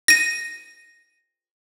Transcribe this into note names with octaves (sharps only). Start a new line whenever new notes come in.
A#6 D#7